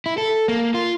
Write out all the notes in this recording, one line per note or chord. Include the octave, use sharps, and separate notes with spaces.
E4
A4
A#3
F4